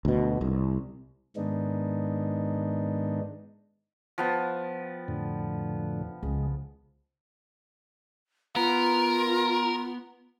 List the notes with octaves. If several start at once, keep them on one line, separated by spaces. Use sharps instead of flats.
D2 B2
C2
G#2 D#3 G#3 B3 D4 D#4
F3 B3 G5
F2 A2 D3
C#2 G#3
B3 F4 A#4